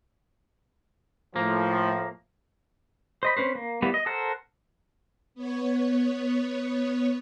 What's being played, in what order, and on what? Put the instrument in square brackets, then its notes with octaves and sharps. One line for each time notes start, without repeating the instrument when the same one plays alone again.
[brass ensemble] A2 F3 [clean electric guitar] A#3
[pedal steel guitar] C5 D#5 B5
C4 C#4 B4 C5
A#3
G3 A#3 B3 E4
D#5
A4 A#4 C5 F#5
[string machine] B3 C#5